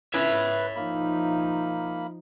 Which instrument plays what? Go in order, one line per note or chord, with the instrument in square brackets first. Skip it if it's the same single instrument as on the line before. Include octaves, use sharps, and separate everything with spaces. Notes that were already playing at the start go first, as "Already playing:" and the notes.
[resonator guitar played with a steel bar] C#4 E4 [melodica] B4 [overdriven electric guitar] C#5 E5
[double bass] F3 D#4 [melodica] A#3 B5